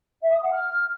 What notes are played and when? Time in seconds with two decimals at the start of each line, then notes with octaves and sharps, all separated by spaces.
0.22 E5
0.32 D#6
0.42 F#5
0.52 F6